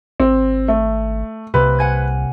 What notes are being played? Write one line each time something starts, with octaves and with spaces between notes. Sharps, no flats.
G#1 C4
A3
C2 C3 A#3 B4
F#5 G#5 G#6